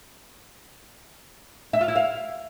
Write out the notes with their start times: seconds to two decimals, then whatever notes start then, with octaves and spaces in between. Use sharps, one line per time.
1.73 E5
1.81 F4
1.88 E4
1.96 F5